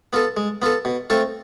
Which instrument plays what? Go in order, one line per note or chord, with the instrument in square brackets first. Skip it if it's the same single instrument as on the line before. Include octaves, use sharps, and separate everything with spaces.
[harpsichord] B3 F4 A4
G#3
B3 F4 A4
B2
A3 C4 F4 A4